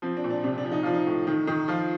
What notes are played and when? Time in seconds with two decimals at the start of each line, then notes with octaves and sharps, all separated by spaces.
0.02 F3 C4
0.17 D4
0.24 A#2
0.30 D4
0.44 C3 D4
0.58 D4
0.64 F3
0.72 D#4
0.83 F3 F4
0.93 D#4
1.07 A2
1.27 D#3
1.47 D#3
1.68 F3 F4